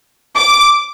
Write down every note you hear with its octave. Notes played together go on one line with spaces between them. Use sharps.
D6